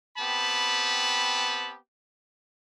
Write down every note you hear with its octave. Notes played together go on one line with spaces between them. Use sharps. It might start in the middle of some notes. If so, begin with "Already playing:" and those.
B3 C4 G4 A5 B5